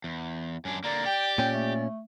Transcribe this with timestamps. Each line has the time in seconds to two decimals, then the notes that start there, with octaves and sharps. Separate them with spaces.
0.04 E2
0.65 F#2 D4 G#5
0.84 D3 A#3 D5 A#5
1.06 G4 G5
1.38 A#2 C#4 G5
1.53 A3